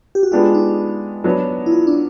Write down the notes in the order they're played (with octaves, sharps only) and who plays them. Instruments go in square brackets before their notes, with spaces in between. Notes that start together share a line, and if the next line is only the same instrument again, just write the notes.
[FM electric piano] G4
F#4
[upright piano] G#3 B3 D4 G4 [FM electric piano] F4
[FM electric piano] D#4
[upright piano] F#3 B3 D4
[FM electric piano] E4
F4
D4